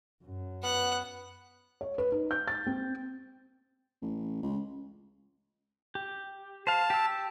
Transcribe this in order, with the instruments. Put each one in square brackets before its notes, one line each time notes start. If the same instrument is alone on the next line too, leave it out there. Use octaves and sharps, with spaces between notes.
[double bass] F#2
[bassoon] B3 [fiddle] F#5 F#6
[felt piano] C#5
B4
D#4
G6
A6
C4
[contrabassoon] A1
C#2
[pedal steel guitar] G4
[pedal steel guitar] C5 F5 [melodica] A5
[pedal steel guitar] G4 E6